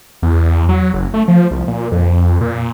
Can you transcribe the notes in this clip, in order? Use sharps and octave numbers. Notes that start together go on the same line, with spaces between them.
E2
F#3
F#1
A3
F3
C2
A#2
F2
A#2